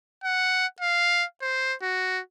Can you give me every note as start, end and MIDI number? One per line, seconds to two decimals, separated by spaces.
0.24 0.66 78
0.80 1.24 77
1.42 1.74 72
1.82 2.20 66